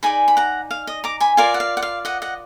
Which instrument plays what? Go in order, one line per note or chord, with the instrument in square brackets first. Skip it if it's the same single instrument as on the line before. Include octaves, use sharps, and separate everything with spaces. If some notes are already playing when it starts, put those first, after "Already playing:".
[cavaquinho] D#4 G#4 D5 G#5 B5
B5
F#5 A#5
F5
D#5
A#5 D6
G#5 B5
F4 A#4 D5 F5 G#5
F#5
F5
F#5
F5
D#5 F#5
D#5 F#5